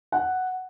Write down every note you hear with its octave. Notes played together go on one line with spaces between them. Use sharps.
F#5